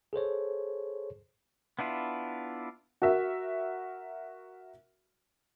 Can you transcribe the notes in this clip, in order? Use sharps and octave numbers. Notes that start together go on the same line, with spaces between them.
G#4 A4 C5 C#5
B3 D4 E4 F4
F#4 A#4 E5